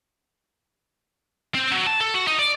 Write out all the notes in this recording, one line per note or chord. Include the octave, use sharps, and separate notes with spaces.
C4
F#3
A5
A4
F#4
D#4
D5